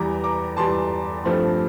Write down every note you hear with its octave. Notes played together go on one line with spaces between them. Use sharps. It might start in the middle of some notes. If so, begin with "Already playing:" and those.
Already playing: E2 E3 G3 A#5 D6
A#5 D6
E2 E3 G3 A5 C6
G2 F3 A3 C4